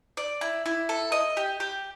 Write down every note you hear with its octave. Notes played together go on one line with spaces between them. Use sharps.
D5
E4
E4
A4
D#5
G4
G4